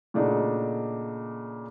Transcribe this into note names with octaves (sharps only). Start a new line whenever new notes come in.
A#2 C#3 A3 D4 D#4 F#4